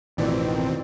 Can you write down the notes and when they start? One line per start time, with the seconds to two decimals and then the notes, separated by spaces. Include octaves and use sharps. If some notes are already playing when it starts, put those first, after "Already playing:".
0.18 A1 F2 B2 D#3 E3 C4 D5